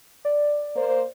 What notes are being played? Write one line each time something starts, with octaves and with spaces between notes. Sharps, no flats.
D5
A#3 C5